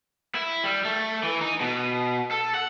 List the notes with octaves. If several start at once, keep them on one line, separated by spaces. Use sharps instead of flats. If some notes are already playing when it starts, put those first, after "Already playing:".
E4
G3
A3
E3
D#4
B2
A4
F#5